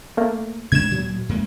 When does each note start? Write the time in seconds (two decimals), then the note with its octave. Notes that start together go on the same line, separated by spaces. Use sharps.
0.17 A3 A#3
0.72 C3 G#3 D4 G#6 E7
0.92 D2 A#2 F#3
1.29 F#2 G#3 A#3